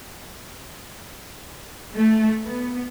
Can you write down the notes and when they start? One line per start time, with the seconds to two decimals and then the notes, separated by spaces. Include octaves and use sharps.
1.94 A3
2.45 B3